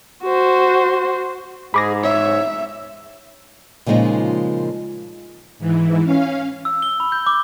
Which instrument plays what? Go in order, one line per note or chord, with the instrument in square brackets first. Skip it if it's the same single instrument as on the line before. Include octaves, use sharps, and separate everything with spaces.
[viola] F#4 C5
[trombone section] G#2 [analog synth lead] G#4 [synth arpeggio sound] B5 D6 A#6
[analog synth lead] C#5 [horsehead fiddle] E5
[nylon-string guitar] A#2 C#3 F3 G#3 D#4
[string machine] G#2 E3
C#4 F5
[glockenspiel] E6
G7
B5
G6
D6